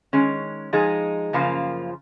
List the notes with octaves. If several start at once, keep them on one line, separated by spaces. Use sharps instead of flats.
D#3 G#3 C#4
F3 G#3 D#4 G#4
F#2 C#3 F3 A#3 F4